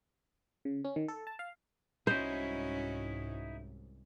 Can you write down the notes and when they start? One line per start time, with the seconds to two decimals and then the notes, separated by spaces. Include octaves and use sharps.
0.65 C#3
0.85 C#4
0.96 D#3
1.08 A4
1.27 A5
1.39 F5
2.07 C2 G#2 C#4 D#4 E4 F#4 C5